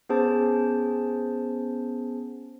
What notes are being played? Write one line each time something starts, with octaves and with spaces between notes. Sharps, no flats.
B3 C#4 G#4 C5 A5